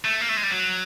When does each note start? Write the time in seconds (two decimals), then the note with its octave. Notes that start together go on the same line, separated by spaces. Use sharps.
0.05 A3
0.21 A#3
0.29 A3
0.37 G#3
0.43 G3
0.51 F#3